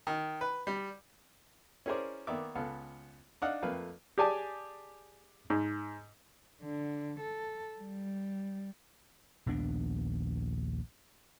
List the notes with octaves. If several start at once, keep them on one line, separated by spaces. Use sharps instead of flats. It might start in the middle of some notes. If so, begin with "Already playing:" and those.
D#3
B4
G3
C#4 E4 G#4 A#4 C5 D5
D#3 A#3 B3 D5 E5 D6
C#2 B3 A4 F5
D4 D#4 D#5 F5 F#5
F2 A3 A#3 B4 F5
G4 G#4 D5 G#5 A5
G#2
D3
A4
G3
A#1 D#2 B3 D4